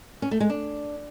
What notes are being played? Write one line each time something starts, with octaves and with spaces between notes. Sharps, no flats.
C#4
A3
G#3
D4